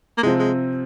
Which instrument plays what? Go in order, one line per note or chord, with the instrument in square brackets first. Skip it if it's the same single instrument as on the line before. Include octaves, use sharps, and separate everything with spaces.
[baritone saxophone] A#3
[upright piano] C3 F3 C4 [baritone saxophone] G#3
[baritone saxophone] G#3